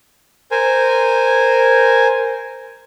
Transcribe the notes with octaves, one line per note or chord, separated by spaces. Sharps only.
A#4 C5 G#5